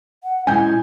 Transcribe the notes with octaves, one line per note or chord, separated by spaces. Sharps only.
F#5
A#2 G#3 C#4 E4 G#5 G6